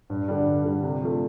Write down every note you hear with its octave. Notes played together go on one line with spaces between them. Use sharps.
G2
D3 G3
G2
D3 G3
C3
F3 A3